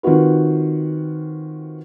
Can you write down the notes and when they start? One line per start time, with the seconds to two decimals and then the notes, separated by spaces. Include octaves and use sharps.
0.03 D#3 C4 F4 F#4 B4